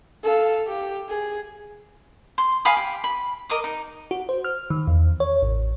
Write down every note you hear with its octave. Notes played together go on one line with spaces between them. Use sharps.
A4 F5
G4
G#4
C6
F5 G#5 B5 D#6
G4
B5
A#4 D#5 D6 D#6
D#4
F#4
C5
F6
D#3
E2
C#5
A1